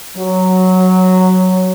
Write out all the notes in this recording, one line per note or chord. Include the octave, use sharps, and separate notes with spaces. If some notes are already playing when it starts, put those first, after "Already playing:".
F#3